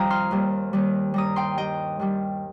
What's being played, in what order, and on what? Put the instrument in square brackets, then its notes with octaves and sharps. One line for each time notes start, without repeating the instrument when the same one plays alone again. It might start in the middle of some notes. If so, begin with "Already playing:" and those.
Already playing: [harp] F2 D#3 G3 F5 G5 A#5 D#6
C6 F6
D#2 D#3 G3
D#2 D#3 G3
G2 G3 A#5 D#6
G5 C6
G2 G3 D#5 G5
G2 D#3 G3